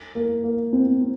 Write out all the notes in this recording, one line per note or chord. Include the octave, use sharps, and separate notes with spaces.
A#3
A#3
C4
C4